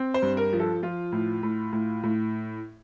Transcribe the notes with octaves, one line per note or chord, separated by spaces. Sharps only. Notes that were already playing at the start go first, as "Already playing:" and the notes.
Already playing: C4
C5
G2
A#4
F3
A4
F3 F4
A2
A2
A2
A2